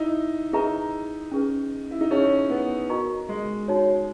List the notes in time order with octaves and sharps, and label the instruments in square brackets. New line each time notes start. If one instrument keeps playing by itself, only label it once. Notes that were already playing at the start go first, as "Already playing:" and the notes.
Already playing: [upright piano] D#4 E4
[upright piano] D#4 [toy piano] G#4 B4 E5 A#5
[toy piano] C#4 G#4 B4
[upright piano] E4
D#4
[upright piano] C#4 [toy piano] E4 G#4 C#5
[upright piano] B3
[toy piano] F#4 A#4 D#5 A#5 C#6
[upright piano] G#3
[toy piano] D#4 F#4 C#5